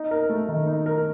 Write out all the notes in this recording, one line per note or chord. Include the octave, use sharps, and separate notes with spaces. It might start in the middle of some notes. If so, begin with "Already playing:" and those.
Already playing: D#4
A#4
A3
D#3
D#4
A#4